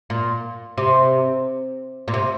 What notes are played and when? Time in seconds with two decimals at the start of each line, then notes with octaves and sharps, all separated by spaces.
0.10 A#2
0.78 C3
2.08 A#2
2.14 C3